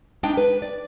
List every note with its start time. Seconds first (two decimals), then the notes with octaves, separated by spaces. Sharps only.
0.23 G#3 D4 D#4 G5
0.37 B4
0.62 D5